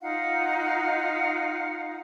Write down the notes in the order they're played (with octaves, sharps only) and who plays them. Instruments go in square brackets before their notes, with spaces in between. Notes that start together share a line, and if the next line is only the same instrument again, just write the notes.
[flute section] D#4 F4 F5 F#5